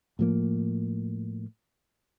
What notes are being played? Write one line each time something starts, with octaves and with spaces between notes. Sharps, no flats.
A2 F3 A#3